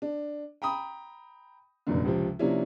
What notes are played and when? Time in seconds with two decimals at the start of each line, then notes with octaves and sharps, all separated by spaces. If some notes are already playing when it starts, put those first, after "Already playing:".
0.02 D4
0.62 G5 A#5 B5 D#6
1.87 F1 F#2 A#2 D3
2.05 C#2 C3 F3
2.39 C3 F3 A#3 C#4 D4 E4